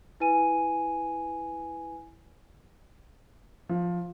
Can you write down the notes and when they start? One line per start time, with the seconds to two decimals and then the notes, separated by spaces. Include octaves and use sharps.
0.20 E4 B4 G#5 D#7
3.69 F3